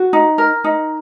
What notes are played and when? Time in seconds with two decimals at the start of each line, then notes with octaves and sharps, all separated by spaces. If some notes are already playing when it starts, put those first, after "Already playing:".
Already playing: F#4
0.13 D#4
0.38 A#4
0.64 D#4